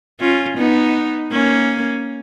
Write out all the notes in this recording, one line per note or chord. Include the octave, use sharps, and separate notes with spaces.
C#4 F4
B3 D#4
A#3 C#4